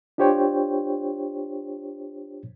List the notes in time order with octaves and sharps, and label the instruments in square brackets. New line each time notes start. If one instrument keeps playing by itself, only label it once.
[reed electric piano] D4 F4 G4 C5 C#5 G5